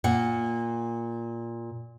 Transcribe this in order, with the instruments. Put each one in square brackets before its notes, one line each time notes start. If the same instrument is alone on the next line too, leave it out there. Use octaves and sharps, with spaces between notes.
[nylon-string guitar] A#2 F#5